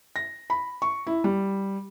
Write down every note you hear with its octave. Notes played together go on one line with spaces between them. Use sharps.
A#6
B5
C#6
E4
G3